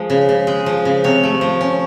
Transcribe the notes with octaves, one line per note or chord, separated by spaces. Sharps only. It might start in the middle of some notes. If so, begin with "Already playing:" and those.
Already playing: F3 G#3 C5
C#3
C#3
G#3
F3
C#3
C3 C#5
A3
F3
C#4